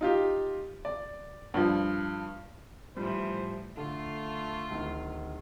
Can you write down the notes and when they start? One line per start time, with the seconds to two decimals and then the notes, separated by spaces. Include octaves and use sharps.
0.01 D#4 F4 G4
0.85 D5
1.54 G2 F3
2.96 A2 E3 F3 G3 C5
3.77 D3 A3 F4
4.70 D1 D#3